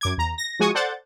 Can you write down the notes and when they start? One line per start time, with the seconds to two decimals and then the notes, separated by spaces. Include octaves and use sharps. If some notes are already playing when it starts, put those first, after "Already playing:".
0.01 F#2 D6 G#6
0.18 E2 A#5
0.38 A#6
0.59 F3 G#3 F#4 G#5 C#6 D#6
0.75 A4 C5 D5 F#5 G6 A6